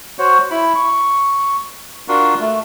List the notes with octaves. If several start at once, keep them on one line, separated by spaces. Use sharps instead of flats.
F#4 C5 C#5
E4 B5
C#6
D4 F4 F#4 A#4
A3